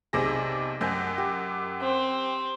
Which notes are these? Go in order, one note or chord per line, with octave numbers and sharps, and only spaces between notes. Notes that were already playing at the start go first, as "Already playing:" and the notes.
B1 C3 G#4 D5 G#5 A#6
F#2 D#5 G5 G#5
G4
C4